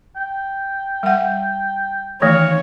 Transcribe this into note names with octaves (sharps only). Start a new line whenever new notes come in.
G5
G3 F#5
D#3 E3 A3 C#5 F5